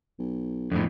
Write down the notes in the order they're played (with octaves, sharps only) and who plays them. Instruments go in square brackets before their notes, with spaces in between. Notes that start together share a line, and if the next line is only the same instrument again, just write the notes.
[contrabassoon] B1
[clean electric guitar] F2 A2 [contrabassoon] D3